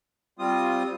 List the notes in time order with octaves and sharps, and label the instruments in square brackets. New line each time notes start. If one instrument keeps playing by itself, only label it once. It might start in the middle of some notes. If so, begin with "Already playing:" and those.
[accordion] G3 C4 F4 D#6